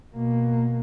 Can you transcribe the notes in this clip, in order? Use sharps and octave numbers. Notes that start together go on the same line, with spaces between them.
B2 A#3